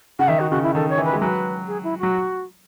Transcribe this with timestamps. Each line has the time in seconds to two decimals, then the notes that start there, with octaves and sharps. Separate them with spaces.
0.19 C#3 F#5
0.28 D#3 E5
0.40 F#4
0.51 C#3 F#4
0.63 E4
0.75 D#3 A4
0.90 C#5
0.98 E3
1.05 B4
1.13 G#3
1.21 F#3 B4
1.67 G#4
1.83 E4
1.99 F#3 F#4